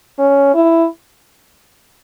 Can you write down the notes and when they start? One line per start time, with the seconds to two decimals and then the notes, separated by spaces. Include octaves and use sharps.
0.19 C#4
0.54 E4